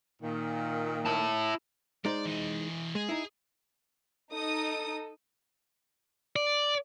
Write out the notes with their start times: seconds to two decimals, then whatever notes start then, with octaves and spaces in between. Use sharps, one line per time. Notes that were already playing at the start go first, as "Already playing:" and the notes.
0.21 A#2 D#3
1.05 E4 A5
2.05 G#3 D#4 C5 D5
2.26 E3 D#5
2.95 G#3 G#4
3.09 D#4 E4
4.32 D#4 A4 D#6
6.36 D5